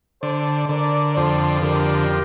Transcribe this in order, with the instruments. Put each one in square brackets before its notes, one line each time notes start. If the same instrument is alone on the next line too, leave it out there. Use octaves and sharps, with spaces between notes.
[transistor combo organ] D3 [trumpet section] A4 C5
[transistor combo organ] D3 [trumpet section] A#4 D5
[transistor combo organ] F2 [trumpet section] A4 C5
[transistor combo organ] D3 [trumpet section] G4 A#4